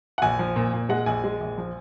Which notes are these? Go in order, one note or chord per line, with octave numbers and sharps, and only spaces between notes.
F#5
A#1 G#5
F3
A#2
A#2
G#3 F#5
A#1 G#5
G#3
A#1
F3